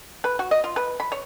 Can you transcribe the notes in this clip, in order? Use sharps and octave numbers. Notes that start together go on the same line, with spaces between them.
B4
F#4
D#5
F4
B4
B5
C#5